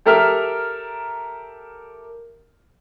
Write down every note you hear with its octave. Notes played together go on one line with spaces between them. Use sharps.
G4 A4 A#4 E5 F6